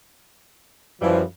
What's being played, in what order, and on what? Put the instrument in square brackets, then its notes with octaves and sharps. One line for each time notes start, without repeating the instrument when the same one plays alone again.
[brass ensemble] F#2 F3 [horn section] E3 G3